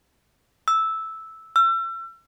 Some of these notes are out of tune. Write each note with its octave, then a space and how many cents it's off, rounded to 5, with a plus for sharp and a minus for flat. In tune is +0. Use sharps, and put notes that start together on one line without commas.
E6 -10
E6 +35